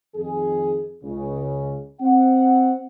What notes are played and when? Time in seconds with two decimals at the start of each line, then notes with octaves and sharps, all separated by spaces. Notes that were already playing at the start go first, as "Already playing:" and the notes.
0.15 F2 D#3 G#4
1.04 C#2 C#3
2.00 C4 F#5